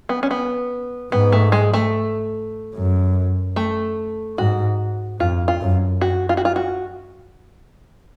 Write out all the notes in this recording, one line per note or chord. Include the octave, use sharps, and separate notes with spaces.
B3
C#4
B3
G#2 B3
A3
G#3
A3
F#2
A3
G#2 F#4
F2 F4
F4
F#2
F#4
F4
F#4
F4
F#4